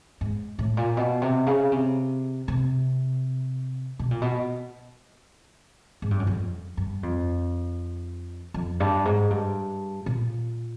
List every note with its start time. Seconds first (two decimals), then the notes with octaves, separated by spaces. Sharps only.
0.21 G#2
0.59 A2
0.77 A#2
0.97 B2
1.22 C3
1.46 C#3
1.72 C3
2.48 C3
3.99 B2
4.11 A#2
4.22 B2
6.02 G#2
6.11 G2
6.20 F#2
6.27 F2
6.77 G2
7.03 F2
8.54 F2
8.80 G2
9.05 G#2
9.30 G2
10.06 A#2